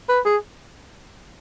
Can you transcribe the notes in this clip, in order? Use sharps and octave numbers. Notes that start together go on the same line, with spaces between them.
B4
G#4